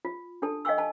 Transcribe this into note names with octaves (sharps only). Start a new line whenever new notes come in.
F4
D4 G4 A4 A5
D#5 F5 G5 G#5 C#6 E6
G#5 A5